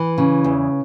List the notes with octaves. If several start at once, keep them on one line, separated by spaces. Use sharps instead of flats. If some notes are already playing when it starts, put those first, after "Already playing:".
Already playing: E3
C#3
E2